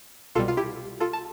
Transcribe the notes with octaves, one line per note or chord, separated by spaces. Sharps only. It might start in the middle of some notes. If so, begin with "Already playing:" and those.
C2 B2 G3 F4 A4
F4
E4 G4
F4 A4
A5